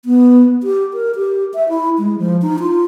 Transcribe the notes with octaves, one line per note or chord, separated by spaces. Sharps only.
B3
G4
A#4
G4
E5
E4
G#3
F3
D#4
F4